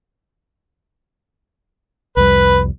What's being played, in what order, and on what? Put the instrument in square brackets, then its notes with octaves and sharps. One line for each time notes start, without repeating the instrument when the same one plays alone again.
[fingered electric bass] C2 F2 G3 [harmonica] B4